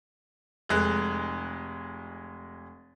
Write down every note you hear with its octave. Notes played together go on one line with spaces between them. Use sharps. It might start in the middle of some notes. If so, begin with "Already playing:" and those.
F1 G#3 F#6